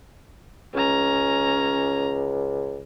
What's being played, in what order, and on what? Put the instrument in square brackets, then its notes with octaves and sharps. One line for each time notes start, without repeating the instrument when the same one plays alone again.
[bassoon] C#2 [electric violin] C#4 A#5